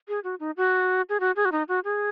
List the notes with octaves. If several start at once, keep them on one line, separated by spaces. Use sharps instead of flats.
G#4
F#4
D#4
F#4
G#4
F#4
G#4
F#4
D#4
F#4
G#4